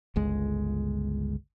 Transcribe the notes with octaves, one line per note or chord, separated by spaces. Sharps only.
G1 C#2 G#3